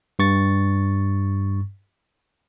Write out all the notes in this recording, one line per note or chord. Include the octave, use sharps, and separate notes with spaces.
G2 C#6 A6